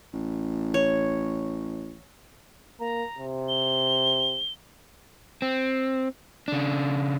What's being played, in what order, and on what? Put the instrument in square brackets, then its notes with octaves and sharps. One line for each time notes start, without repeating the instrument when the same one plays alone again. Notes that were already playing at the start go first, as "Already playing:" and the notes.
[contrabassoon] A1
[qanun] C#5
[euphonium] A#3 [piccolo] A#5
[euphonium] C3
[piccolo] G7
[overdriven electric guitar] C4
C#3 D4